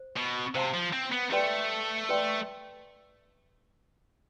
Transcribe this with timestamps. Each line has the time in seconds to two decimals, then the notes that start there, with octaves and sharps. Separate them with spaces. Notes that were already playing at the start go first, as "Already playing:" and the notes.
Already playing: C5
0.17 B2
0.55 C3 C5 F5 A5 C6
0.74 F3
0.93 C4
1.12 B3
1.32 A3 G4 B4 D5 G5 C6
2.09 G4 B4 D5 G5 C6